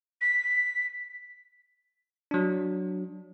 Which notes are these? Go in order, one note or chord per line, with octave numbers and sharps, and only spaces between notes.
B6
F#3 D4